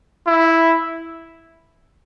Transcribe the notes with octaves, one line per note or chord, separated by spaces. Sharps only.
E4